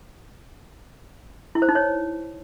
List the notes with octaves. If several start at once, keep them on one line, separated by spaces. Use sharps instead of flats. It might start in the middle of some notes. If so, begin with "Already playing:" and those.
E4
C5
D#4
C#5